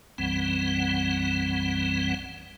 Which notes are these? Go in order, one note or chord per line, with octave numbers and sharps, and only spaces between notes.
B1 F#2 E3 G3 C4 F#5